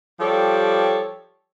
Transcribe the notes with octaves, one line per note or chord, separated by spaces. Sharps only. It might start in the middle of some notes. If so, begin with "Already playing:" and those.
F3 G3 G4 A4 C#5